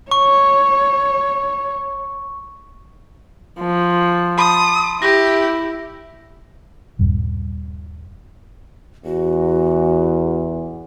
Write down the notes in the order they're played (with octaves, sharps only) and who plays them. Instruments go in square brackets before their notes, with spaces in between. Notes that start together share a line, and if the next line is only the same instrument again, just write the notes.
[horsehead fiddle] C#5 [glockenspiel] C#6
[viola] F3
[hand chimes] A5 B5 C6 [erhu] D#6
[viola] E4 [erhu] G4 [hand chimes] A#6
[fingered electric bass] D#1 G2
[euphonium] E2 [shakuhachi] F#4